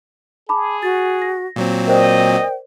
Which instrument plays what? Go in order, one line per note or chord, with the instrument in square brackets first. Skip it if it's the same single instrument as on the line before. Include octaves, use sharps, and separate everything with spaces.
[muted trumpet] G#4 [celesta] A5 B5 D6
[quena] F#4 [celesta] A6
[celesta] A#6
[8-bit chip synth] A#2 F#3 C4
[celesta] A#4 C5 D5 [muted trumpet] D#5 [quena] G5